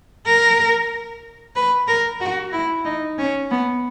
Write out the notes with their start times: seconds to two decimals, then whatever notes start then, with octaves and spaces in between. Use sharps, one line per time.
0.25 A#4
1.55 B4
1.87 A#4
2.20 F#4
2.52 E4
2.85 D#4
3.18 C#4
3.50 B3